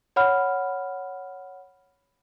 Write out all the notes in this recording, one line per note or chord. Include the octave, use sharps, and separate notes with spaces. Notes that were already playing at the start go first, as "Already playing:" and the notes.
C#5 F#5 B5 F6